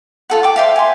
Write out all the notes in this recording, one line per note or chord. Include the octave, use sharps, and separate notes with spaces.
F4 A4 F#5
G5 D6
C5 E5 F5
G#5 C6